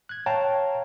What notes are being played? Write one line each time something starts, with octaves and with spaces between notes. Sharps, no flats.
F#6 G#6
C#5 F5 G5 A5 A#5